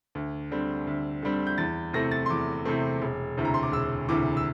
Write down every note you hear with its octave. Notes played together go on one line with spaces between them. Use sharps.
D2
D3 G3 C4
D2
D3 G3 C4
G6
E2 A6
C3 E3 A3 C4 A#6
A6
C6
E2 D6
C3 E3 A3 C4
E1
D2 C3 E3
A#5
C6
D6
E1 E6
D2 C3 E3 D6
E6